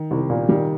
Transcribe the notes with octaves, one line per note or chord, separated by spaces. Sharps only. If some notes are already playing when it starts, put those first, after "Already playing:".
Already playing: D#3
C2 C3
A#2
D#3 G3